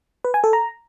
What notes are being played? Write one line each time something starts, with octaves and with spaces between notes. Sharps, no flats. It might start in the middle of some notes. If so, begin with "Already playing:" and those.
B4
G#5
A4
A#5